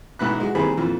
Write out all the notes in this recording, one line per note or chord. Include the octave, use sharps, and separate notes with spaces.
A1 G#2 B2 B5 F#6
G#3 F#4
D#2 E3 G3 C4 G#4 B5
F2 A#2 E3